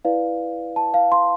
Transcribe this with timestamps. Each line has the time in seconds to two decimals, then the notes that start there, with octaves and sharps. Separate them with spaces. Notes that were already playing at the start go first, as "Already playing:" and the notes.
0.05 E4 B4 D5 F5
0.76 A5
0.94 F5
1.12 C6